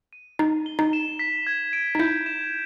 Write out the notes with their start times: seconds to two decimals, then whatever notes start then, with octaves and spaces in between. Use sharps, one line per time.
0.13 D#7
0.39 D#4 C7
0.66 G7
0.79 D#4
0.93 E7
1.19 B6
1.47 G#6
1.73 D7
1.95 D#4
1.99 E4 G6
2.26 E7